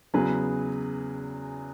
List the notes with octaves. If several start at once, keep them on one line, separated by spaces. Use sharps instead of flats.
E2 C#3 F#3 G#4 B4